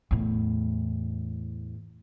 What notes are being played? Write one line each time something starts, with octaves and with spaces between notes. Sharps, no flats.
E2 A2